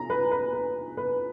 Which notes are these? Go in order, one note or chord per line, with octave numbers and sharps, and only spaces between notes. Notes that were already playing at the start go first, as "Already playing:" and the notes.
Already playing: A#5
B4
B4
B4
B4